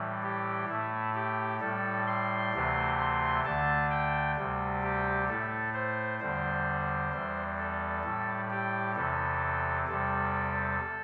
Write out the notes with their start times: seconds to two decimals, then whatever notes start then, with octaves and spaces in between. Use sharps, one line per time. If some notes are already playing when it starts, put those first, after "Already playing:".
Already playing: A2 E3 G3
0.23 G4
0.69 A2 A3 E4
1.15 G4
1.61 A2 G3 A4
2.07 C6
2.52 D2 C3 E3 A3
2.98 C6
3.44 D2 D3 A3 A5
3.90 G5
4.37 D2 C3 G3
4.83 G4
5.28 A2 A3 A4
5.74 C5
6.20 E2 D3 G3 C5
7.13 E2 E3 G3
7.58 A4
8.04 A2 G3
8.50 G4
8.95 E2 C3 E3 A4
9.87 E2 C3 G3 A4